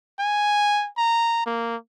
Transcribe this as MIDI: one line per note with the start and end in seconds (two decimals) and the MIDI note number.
0.19 0.88 80
0.98 1.42 82
1.46 1.76 58